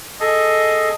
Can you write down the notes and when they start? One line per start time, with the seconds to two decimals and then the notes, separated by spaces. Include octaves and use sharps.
0.20 G#4 A4 D#5